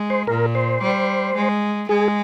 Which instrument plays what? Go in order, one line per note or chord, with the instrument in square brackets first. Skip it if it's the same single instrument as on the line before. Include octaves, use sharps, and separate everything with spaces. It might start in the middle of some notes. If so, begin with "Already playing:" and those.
Already playing: [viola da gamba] G#3
[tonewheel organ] C5
[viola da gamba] A#2 [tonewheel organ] A#4
[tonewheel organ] C5
[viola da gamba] G3
G#3
[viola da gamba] G#3 [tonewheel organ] G#4